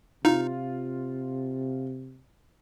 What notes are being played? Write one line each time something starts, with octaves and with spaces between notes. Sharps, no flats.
C3 D#4 F4